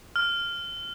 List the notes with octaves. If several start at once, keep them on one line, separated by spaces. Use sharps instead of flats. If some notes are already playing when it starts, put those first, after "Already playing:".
F6